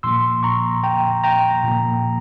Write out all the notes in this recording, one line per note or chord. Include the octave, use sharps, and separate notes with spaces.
A#2 F3 A#3 C6 E6
A#5 C#6
G5 A#5
G5 A#5
A#2 F3 A#3